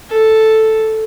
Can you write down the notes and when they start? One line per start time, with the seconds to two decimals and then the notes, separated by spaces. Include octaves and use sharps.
0.10 A4